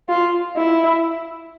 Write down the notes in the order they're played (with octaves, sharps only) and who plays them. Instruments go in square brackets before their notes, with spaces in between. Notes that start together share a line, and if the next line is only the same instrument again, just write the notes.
[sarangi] F4
E4